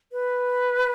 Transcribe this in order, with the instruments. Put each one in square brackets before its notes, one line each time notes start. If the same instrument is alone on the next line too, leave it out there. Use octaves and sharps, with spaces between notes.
[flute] B4